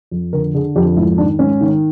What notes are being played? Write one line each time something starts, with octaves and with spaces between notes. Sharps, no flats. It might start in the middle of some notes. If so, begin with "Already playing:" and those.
F2
D3 A#4
D3 G#4
F2 G4
G#2 E4
D#3 D4
G#2 C#4
D#3